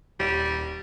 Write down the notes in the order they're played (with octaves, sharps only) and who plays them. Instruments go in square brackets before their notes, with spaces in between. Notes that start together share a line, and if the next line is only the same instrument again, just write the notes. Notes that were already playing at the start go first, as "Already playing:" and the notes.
[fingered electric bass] D#1 [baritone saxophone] G3